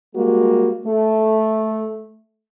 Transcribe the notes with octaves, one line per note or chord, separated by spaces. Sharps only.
G3 G#3 A#3 F#4
A3